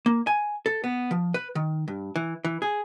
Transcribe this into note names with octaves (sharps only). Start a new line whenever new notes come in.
A#3
G#5
A4
B3
F3
B4
D#3
G2
E3
E3
G#4